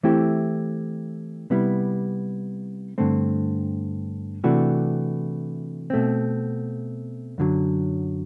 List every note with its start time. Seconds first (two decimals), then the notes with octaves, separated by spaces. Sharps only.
0.03 E3 A3 C4 E4 G4
1.50 C3 G3 B3 E4
2.98 G2 D3 A3 C4
4.44 C3 E3 A3 D4 F#4
5.90 B2 A3 C4
7.38 F#2 D3 F#3